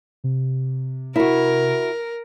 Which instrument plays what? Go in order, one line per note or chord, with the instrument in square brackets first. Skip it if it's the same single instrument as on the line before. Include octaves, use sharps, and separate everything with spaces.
[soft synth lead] C3
[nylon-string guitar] E4 F#4 [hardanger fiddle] A#4